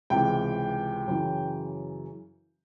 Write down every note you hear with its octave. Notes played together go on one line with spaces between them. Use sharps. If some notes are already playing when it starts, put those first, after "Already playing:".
C#2 C3 E3 G5
F#2 C#3 E3